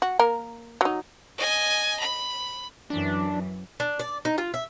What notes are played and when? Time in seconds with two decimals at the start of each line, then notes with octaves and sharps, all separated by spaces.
0.02 F#4
0.19 A#3 A#4
0.81 F#3 D#4
1.38 D#5 G#5
2.00 B5
2.90 F#2 E3 D4
3.80 D4
3.99 D5
4.25 D#4
4.38 F4
4.54 E5